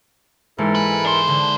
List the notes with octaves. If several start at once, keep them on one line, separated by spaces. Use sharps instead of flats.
G#2 E3 E4 A4 A#4
B4
D4 C5
D3